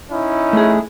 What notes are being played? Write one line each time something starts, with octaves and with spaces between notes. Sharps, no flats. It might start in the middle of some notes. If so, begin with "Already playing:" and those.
C#4 D#4 E4
A3 G#4